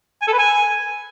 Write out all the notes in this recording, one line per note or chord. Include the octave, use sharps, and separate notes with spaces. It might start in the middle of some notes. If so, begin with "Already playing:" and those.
G#5
A4
B4
G#5